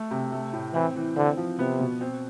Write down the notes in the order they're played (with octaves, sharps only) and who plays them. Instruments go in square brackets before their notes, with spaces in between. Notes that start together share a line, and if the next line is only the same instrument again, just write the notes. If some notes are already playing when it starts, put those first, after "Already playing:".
Already playing: [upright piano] A3
C3
A3
A2
[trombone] E3 [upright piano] C4
[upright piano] E3
[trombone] D3 [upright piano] C4
[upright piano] F3
[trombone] C3 [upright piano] B3
[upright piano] B2
C4